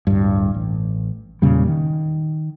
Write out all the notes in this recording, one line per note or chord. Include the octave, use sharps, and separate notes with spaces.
D1 G2
A1
E2 A#2 C#3 G3
D#3